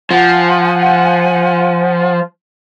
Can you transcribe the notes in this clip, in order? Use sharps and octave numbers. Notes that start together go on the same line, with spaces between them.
F3 F#5 G#5